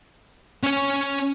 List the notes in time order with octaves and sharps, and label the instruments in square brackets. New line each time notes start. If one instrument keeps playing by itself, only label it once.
[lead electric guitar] C#4 C#5